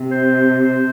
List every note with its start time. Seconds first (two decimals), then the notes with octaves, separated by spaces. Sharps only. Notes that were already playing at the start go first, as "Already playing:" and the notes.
Already playing: C3
0.11 C5
0.63 C5